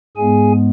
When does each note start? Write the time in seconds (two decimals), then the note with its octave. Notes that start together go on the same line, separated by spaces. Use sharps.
0.17 G#2 G#3 B3 G#4 G#5